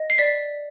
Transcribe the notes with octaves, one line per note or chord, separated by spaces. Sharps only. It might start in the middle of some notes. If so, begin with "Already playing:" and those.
Already playing: D#5
C7
D5 B6